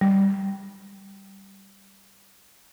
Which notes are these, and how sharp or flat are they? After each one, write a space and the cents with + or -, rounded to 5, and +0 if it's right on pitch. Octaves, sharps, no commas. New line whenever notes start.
G3 +0